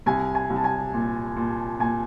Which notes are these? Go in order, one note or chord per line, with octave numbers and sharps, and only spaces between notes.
C2 G#5
G#5
C2
A5
G#5
A#2
A#2
A#2 G#5